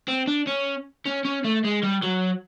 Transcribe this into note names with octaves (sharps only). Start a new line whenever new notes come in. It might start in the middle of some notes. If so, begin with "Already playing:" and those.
C4
D4
C#4
C#4
C#4
A3
G#3
G3
F#3